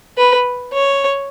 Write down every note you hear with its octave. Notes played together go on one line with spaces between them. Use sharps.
B4
C#5